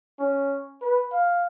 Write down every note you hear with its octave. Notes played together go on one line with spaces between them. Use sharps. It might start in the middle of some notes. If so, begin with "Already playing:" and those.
C#4
B4
F5